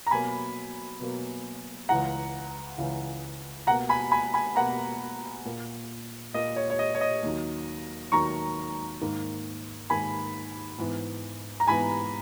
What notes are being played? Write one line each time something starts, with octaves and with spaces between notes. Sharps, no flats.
A#5
B2 F#3 A#3 G#5 B5
B2 F#3 A#3
C#2 C#3 E3 F#5 A#5
C#2 C#3 E3
B2 A#3 F#5 A#5
G#5 B5
G#5 B5
G#5 B5
B2 A#3 F#5 A#5
A#2 A#3
A#2 A#3 D#5
C#5
C#5
D#5
C#5
D#5
D#2 D#3 F#3
D#2 D#3 F#3 A#5 C#6
G#2 D#3 A#3
G#2 D#3 A#3 G#5 B5
G#2 E3 B3
A#5
G#2 E3 B3 G#5 B5